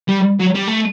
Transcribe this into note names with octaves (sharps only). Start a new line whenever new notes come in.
G3
F#3
G3
A3